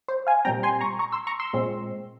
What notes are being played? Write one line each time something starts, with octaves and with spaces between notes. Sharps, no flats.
C5
F5 G#5
A#2 G3 C4 G5 A#5
G#5 C6
A#5 C#6
A#5 C#6
C6 E6
A#5 C#6
C6 E6
A#2 G#3 C4